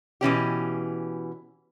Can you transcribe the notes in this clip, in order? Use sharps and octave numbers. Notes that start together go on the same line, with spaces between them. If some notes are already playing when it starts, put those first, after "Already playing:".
B2 E3 C#4 G4